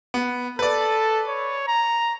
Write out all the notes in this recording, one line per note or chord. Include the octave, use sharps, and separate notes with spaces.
B3
A4 B4 D5
C#5
A#5